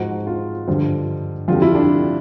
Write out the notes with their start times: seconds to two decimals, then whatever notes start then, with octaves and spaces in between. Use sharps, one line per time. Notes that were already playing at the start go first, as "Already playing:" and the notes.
Already playing: G#2 F3 F#4
0.27 F4
0.67 G2 D3 F3
1.48 F2 D3 G3 F4
1.62 E4
1.75 D4